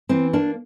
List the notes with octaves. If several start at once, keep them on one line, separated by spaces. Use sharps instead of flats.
E3 C4
A#3 D4